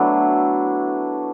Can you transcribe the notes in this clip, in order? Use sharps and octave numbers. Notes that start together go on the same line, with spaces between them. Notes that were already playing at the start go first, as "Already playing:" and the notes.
Already playing: F#3 A3 B3 D4 E4